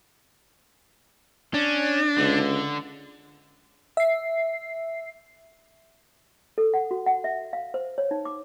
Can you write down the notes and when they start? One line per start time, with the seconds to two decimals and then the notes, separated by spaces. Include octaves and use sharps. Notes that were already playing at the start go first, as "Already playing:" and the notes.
1.54 C#4 D4
2.18 C#2 D3
3.97 E5 C7
6.58 A4
6.74 F#5
6.91 F#4
7.06 F#5
7.24 E5
7.53 F5
7.74 C5
7.98 C#5
8.11 D#4
8.25 D6